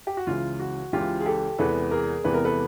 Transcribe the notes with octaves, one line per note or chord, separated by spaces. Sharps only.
G4
F#4
C#2 C#3 E3 F4
F#4
C#2 C#3 E3 F4 G4
G#4
G4 A4
E2 C3 E3 G#3 B3 A4 B4
G#4 A#4
E2 C3 E3 G#3 B3 B4
A#4
A4 B4